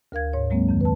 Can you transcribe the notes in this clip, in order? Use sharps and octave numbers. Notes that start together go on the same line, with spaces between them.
D2 A#4 F5 G#6
G#2 C#5
F#3 G#3 A#3 C4
F2 D#3
B4 A5